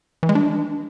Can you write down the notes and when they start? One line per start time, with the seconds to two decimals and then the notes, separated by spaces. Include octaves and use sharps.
0.23 E3
0.29 G#3
0.35 D4